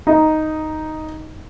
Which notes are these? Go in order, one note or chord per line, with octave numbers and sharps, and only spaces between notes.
D#4